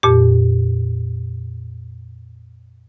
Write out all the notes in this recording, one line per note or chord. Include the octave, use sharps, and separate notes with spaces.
F2 A#2 G4